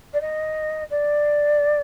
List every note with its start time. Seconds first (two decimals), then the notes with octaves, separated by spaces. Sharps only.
0.13 D5
0.21 D#5
0.90 D5